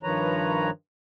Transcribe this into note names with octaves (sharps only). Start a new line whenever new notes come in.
G2 D#3 F3 B4 C#5 A#5